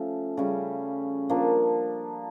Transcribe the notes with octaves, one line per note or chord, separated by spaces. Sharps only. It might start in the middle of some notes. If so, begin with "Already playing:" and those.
Already playing: F3 A3 C#4
C#3 G3 C#4
F3 A#3 D4